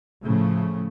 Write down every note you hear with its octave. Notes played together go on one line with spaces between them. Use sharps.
A2 C#3 F3 A3